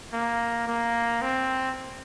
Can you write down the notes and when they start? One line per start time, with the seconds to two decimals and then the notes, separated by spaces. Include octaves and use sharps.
0.13 A#3
0.67 A#3
1.22 C4